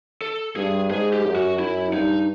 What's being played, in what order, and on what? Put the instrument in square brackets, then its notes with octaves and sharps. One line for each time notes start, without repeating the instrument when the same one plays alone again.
[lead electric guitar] A4
[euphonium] G2 [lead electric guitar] G#4
[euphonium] G#2 [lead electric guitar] G#4
[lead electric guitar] G4
[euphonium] F#2
[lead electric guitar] F#4
[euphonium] F#2 [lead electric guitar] E4
[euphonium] G2 [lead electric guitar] D#4